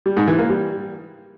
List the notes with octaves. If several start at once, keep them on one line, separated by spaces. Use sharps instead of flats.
G3
G#2
E3
A#3
G3